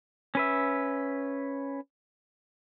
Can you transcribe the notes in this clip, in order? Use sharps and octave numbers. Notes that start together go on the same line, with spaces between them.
C#4 B4 E5